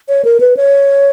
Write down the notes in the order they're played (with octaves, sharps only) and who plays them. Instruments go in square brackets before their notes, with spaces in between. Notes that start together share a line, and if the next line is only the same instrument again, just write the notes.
[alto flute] C#5
A#4
B4
C#5